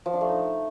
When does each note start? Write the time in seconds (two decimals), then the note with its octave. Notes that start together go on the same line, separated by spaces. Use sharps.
0.06 F3
0.13 D4
0.21 A3
0.29 D#4